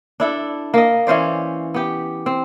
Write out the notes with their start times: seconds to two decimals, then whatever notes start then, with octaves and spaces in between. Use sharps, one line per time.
0.20 D4 E4 A4
0.74 A#3 D#5
1.07 E3 C#4 C5 D5
1.74 B3 G4
2.26 C4